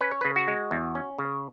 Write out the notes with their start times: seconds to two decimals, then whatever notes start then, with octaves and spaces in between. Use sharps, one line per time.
0.01 C#4 B4
0.11 C#5
0.21 C#3 B4
0.36 F#4
0.48 G#3
0.71 E2
0.95 C#4
1.18 C#3